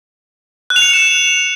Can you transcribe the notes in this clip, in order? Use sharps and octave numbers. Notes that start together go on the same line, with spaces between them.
F#6
F7
C#7
F7
E7